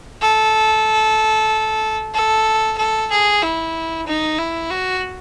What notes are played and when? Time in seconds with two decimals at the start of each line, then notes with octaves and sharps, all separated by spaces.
0.22 A4
2.14 A4
2.78 A4
3.11 G#4
3.42 E4
4.07 D#4
4.39 E4
4.70 F#4